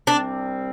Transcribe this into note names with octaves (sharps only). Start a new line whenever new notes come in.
C2 C3 G3 C4 D4